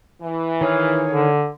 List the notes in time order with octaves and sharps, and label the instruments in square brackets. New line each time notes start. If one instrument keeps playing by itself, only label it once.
[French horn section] E3
[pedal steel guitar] D#3 G#4 F5 [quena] C#5
[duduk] D3